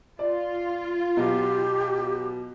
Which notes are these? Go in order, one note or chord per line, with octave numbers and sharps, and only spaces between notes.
F4 D5
B2 F#3 G4